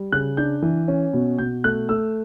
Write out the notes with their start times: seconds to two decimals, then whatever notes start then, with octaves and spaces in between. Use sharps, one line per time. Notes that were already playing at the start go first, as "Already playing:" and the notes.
Already playing: G3
0.12 C#3 F#6
0.37 D4 G6
0.62 E3
0.88 C#4
1.13 B2
1.39 B2 G6
1.64 A3 F#6
1.89 A3 E6